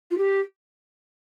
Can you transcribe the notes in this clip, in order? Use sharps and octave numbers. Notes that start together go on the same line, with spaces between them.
F4
G4